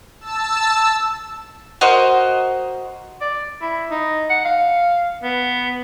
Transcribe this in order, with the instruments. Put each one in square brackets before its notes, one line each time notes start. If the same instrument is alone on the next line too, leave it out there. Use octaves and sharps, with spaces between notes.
[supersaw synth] A5 E6
[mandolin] F#4 A#4 C5 D#5
[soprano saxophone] D5
E4
D#4
F#5
F5
B3